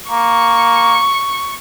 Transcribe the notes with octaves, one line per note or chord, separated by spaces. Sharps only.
A#3 C#6